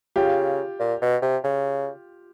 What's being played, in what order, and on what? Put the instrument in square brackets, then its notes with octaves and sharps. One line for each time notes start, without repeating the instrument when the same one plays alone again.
[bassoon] C#3 [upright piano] F4 G4
[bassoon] A#2
B2
C3
C#3